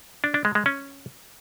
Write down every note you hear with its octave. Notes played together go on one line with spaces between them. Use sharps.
D4
D4
G#3
G#3
C#4